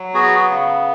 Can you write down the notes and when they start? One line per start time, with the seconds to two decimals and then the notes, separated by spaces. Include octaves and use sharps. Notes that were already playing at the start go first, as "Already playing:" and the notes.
Already playing: F#3
0.14 B3 F#4 G#4
0.49 C#3